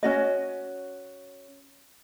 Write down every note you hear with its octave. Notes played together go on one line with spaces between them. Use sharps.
C#4 F#4 D#5